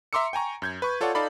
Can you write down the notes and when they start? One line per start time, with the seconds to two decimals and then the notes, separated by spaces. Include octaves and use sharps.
0.13 E5 A#5 C6 D6 E6 C#7
0.33 G5 G#5 A#5 C#6
0.62 F#2 G6 G#6
0.82 B4 C#6
1.01 F4 A4 C#5 D5 F#5
1.15 D#4 A4 D5 F5 B5